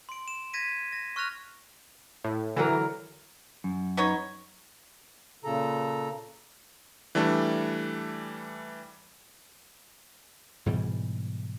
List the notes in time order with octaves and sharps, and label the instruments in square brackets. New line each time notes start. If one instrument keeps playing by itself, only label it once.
[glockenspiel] C6 D7
E7
G#6 A#6 B6 D#7
A#6
C#6 F6 F#6 A#6 F7
[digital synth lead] A2
[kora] D3 F#3 A#4 [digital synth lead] E3
[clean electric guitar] F#2
[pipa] B3 D#4 C#5
[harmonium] A#2 C#3 A4 A#5
[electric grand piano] E3 G3 A3 D4
[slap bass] G#2 B2 E3 G3